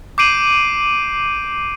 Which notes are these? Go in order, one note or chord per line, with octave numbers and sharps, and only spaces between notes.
D6 G6 C7 D7 D#7 F#7